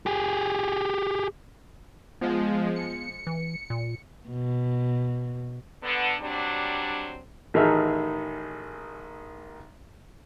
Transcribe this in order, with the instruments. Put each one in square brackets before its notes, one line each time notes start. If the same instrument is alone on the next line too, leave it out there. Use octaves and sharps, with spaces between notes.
[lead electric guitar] G4 G#4
[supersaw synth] F3 G#3 [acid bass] B3
[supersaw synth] C#7
[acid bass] E3
A#2
[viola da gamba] B2
[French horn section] D3 B3
F#3 G3 C4 D4
[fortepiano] A1 D#3 D#4 G#4 E5 F6